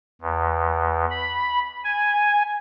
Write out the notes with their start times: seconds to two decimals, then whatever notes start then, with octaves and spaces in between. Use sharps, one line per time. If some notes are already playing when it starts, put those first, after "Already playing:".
0.21 E2
1.11 B5
1.84 G#5